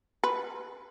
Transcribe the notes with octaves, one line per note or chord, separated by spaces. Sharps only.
B4